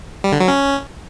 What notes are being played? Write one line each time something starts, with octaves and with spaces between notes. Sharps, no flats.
G3
D3
F#3
C#4